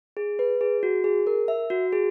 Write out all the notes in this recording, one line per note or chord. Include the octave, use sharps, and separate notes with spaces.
G#4
B4
G#4
F#4
G#4
A#4
E5
F#4
G#4